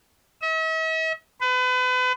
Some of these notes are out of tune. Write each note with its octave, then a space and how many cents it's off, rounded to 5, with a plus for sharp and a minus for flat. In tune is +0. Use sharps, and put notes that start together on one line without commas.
E5 -45
B4 +35